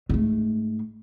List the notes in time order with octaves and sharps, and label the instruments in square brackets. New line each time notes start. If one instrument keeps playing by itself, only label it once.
[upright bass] G#2 A3